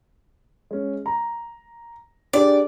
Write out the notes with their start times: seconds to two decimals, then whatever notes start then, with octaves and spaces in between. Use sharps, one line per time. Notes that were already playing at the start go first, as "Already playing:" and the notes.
0.71 G#3 C#4
1.06 A#5
2.33 D4 G4 G#4 D5